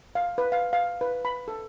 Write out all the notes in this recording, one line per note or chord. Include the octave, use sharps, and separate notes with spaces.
F5
B4
F5
F5
B4
B5
A4